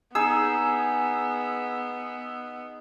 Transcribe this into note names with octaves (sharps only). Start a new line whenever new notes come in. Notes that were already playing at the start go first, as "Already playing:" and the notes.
B3 D#4 G#4 E6